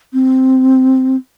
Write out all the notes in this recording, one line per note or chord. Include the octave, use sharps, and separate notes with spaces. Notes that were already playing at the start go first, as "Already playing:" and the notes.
C4